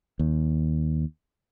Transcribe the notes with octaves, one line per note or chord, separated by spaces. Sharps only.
D#2